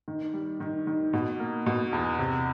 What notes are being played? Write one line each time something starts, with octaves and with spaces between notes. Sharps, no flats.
D#3
G3
D#3
D#3
B2
A#3
B2
E2
C3